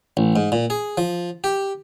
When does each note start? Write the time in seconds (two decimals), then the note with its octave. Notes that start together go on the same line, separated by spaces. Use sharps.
0.17 A1
0.36 G#2
0.52 A#2
0.70 G#4
0.98 F3
1.44 G4